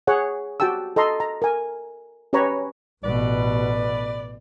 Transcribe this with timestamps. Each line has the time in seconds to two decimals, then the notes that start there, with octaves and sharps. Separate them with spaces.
0.07 G#4 C#5 F#5
0.60 F#4 G4 G5 A5 E6
0.96 A4 D#5 A#5 C6
1.20 A#5
1.42 A#4 G#5
2.33 C#4 G4 B4 C#5 A#5 B5
3.04 A1 B2 B4 D5